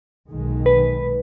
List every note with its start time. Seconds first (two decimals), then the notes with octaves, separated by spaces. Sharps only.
0.29 B1 D#3 G#3
0.66 B4